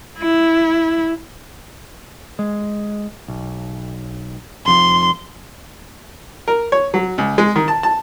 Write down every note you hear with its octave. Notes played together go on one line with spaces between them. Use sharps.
E4
G#3
B1
F1 F2 F3 C6
A#4
C#5
F#3
C#2
G#3
D#3
A5
A5